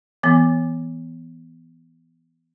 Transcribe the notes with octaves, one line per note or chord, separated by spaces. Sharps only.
E3 B3